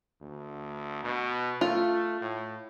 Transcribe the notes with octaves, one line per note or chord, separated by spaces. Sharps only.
D2
B2
A3 F4
A2